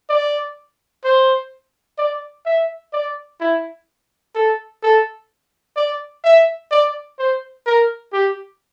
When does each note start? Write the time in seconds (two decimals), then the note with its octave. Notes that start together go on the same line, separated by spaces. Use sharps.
0.09 D5
1.04 C5
1.98 D5
2.46 E5
2.93 D5
3.40 E4
4.35 A4
4.83 A4
5.76 D5
6.24 E5
6.71 D5
7.19 C5
7.66 A#4
8.13 G4